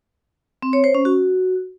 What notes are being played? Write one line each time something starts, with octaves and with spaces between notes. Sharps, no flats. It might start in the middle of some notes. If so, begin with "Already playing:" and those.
C4
C#5
C5
C#4
F#4